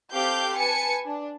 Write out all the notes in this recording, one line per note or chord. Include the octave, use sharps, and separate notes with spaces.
C4 G4 A4 F5 D6 G6
B4 G#5 A5 C#7
D4